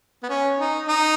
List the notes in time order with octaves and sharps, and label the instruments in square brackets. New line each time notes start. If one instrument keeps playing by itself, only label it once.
[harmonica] B3
C#4
D#4
D#4